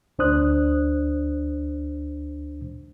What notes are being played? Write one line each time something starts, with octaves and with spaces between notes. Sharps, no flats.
D2 D4 C5 D#6 F#6